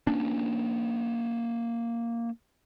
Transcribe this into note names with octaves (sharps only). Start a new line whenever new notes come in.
A#3 C#4 D4